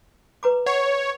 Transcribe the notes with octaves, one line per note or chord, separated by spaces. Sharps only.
B4 A#5 D6
C#5 F#5